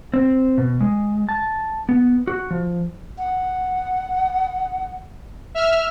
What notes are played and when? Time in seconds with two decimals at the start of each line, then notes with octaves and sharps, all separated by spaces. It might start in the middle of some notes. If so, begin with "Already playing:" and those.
0.14 C4
0.58 B2
0.81 G#3
1.29 A5
1.89 B3
2.27 F#4
2.51 F3
3.18 F#5
5.54 E5 F6